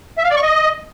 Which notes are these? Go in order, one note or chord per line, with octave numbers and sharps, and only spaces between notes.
E5
F5
D5
C#6
D#5